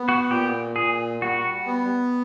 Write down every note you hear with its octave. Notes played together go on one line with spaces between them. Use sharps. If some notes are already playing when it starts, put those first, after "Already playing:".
Already playing: B3
F#4
A#2 G4
A#2 G#4
G3 F#4
B3